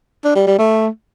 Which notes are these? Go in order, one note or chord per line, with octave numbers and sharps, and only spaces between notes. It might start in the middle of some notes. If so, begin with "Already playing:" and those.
D4
G3
G3
A3